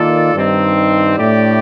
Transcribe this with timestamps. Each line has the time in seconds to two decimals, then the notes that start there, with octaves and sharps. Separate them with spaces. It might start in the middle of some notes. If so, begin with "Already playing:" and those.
Already playing: D#3 A#3 F4 A4 D5
0.34 G2 D#3 G3 C4 D#4
1.18 A2 A3 D4 G4 D5